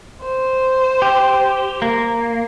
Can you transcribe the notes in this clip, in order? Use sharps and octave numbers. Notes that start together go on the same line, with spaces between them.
C5
G4
A#3